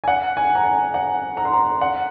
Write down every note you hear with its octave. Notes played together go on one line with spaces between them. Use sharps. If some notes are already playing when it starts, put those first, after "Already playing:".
G#5
F#5
G#5
A#5
G#5
F#5
A#5
C6
A#5
F#5